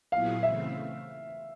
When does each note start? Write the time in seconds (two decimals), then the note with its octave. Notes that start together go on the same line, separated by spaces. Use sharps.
0.12 A#2 F#3 B3 E4 G#4 F5
0.43 C#3 E3 A3 C4 E5